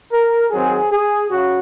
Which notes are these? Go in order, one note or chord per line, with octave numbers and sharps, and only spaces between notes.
A#4
D#3 F#3 C4 G#4
G#4
C#3 F#4